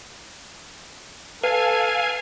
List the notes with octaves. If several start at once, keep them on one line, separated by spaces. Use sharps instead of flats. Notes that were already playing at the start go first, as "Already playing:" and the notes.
A4 B4 F5 G#5